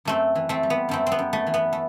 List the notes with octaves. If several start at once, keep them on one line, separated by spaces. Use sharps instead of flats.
F#2 A3 C4
E3
A3 C4
G3
B3
F#2 A3 C4
C4
B3
F#2
A3
E3
B3
A3